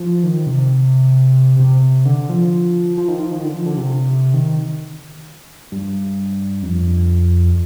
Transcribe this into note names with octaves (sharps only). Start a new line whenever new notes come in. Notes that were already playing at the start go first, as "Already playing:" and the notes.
Already playing: F3
D#3
C3
C3
D3
F3
F3
D#3
F3
D#3
D3
F3
D3
C3
D#3
G2
F2